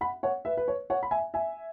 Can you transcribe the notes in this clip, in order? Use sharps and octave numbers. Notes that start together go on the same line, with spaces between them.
F#5 B5
C#5 F#5
B4 E5
B4
C#5
C#5 F#5
B5
E5 G#5
E5 G#5